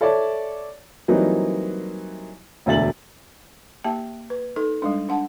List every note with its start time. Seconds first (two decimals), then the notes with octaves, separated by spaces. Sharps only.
0.01 A4 C#5 D5 E5 A5
1.08 E3 F#3 G3 A#3 C4 D#4
2.66 E1 D2 E5 A6 F#7
3.84 A#3 G4 E5 A5
4.30 B4
4.56 D#4 A4
4.82 G3 G#3 D4
5.09 D4 F#5 A5